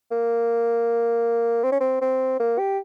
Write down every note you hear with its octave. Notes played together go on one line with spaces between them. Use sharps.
A#3
C4
C#4
C4
C4
A#3
G4